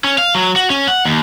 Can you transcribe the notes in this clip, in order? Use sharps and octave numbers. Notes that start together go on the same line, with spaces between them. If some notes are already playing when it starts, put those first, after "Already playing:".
C#4
F5
F#3
F#4
C#4
F#5
D#2